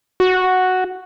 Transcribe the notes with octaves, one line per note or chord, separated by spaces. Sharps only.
F#4